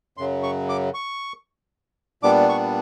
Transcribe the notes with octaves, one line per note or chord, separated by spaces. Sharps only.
F#2 C#3 F#3 C6
C#6
D6
C#6
A#2 G3 B3 D4 D6
C#6